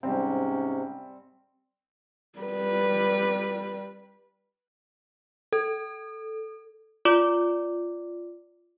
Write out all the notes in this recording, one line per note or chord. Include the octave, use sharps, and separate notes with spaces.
G#2 C3 G3 C4 C#4
G3 B4
A4
F4 D5 D6